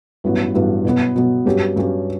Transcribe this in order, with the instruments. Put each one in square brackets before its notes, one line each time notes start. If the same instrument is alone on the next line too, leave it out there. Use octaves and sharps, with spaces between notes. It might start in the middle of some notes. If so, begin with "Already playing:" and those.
[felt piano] A1 G2 F#3 B3
A1 G2 F#3 B3
B2 F#3 B3
B2 F#3 B3
G2 F#3 C#4 G4
G2 F#3 C#4 G4